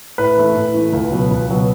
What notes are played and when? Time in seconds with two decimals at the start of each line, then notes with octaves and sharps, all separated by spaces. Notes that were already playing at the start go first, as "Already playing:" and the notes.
0.18 A2 B4
0.37 E3 A3
0.55 A2
0.74 E3 A3
0.93 C#2
1.12 B2 F#3 B3
1.31 C#2
1.49 B2 F#3 B3